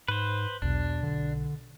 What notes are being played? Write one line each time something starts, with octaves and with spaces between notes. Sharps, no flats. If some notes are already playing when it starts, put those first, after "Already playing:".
G#2 B4 C5
B1 E2 D4
D3